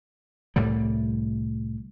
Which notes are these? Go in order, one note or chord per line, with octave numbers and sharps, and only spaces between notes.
C2 A2 D3 G3